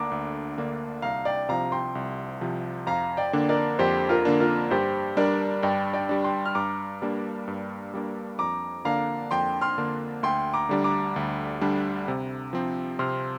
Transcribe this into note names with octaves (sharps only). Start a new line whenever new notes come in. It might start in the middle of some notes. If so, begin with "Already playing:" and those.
Already playing: D2 D3 A#3 D4 A#5 D6
D2
D3 A#3 D4
C2 F5 A#5
D5 G5
C3 F3 F5 A#5
G5 C6
C2
C3 F3
F2 F5 A#5
D5 G5
D3 A#3 D4
A#4 D5
F2 G4 C5
F4 A#4
D3 A#3 D4
F4 A#4
G2 G4 C5
G3 D4 A#4 D5
G2 D5 G5
D5 G5
G3 D4
G5 C6
F6
G2 A#5 D6
G3 A#3 D4
G2
G3 A#3 D4
F2 A#5 D6
D3 A#3 D4 F5 A#5
F2 G5 C6
C6 F6
D3 A#3 D4
D2 G5 C6
A#5 D6
D3 G3 D4
A#5 D6
D2
D3 G3 D4
C3
F3 C4
C3 C6 F6